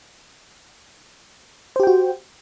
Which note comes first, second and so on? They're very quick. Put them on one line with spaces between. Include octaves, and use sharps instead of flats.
C5 G4 G5 F#4